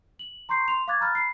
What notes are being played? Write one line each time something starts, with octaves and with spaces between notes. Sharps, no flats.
F#7
A#5 C6 C#6 G6 C7
C6 F7
F5 C#6 D6 F#6 G#6 A6
A#5 B5 F6 F#6 A6
B5 C7